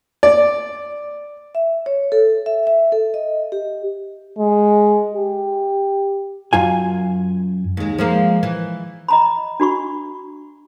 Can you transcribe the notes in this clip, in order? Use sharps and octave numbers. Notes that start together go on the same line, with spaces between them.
D5
E5
C#5
A4
E5
E5
A4
D#5
G4
G#3
G4
F#2 F4 G#5
D#2 G#3
F3 G#3 A#3
E3
D#5 A#5 B5
D4 F#4 B5 C#6